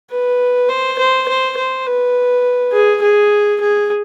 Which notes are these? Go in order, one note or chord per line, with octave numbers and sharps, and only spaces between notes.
B4
C5
C5
C5
C5
B4
G#4
G#4
G#4